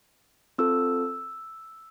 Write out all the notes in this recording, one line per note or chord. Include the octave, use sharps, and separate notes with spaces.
C4 F4 A4 E6